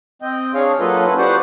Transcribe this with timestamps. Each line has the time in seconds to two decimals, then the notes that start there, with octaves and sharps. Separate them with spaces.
0.22 C4 D#5 G5
0.55 D4 G#4 C#5 F5
0.80 F#3 A#3 F4 A4 B4 D#5
1.05 C#4 E4 A4 B4
1.18 F#4 G4 B4 C5 D5 F#5